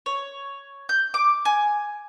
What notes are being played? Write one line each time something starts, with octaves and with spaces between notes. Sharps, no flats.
C#5
G6
D6
G#5